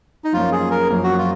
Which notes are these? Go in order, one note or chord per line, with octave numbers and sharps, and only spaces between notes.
D#4
F#2 F3 A#3 C#4 F4
G#4
A#4
F#2 F3 A#3 C#4
F#4
F4